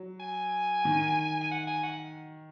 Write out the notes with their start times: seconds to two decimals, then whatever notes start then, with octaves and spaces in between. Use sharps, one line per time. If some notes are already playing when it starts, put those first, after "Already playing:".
Already playing: F#3
0.20 G#5
0.85 D#3
1.41 G#5
1.51 F#5
1.67 G#5
1.83 F#5